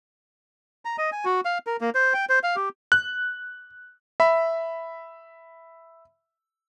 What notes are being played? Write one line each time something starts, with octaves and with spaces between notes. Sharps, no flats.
A#5
D#5
G#5
F#4
F5
A#4
A#3
C5
G5
C5
F5
G4
F#6
E5 B5